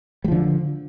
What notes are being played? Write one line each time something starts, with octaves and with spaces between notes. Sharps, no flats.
D3 F3 G3